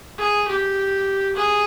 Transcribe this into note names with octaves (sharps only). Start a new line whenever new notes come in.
G#4
G4
G#4